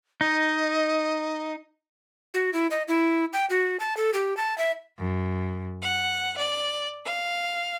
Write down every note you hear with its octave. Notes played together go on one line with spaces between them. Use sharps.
D#4 D#5
F#4
E4
D#5
E4
G5
F#4
A5
A4
G4
A5
E5
F#2
F#5
D5
F5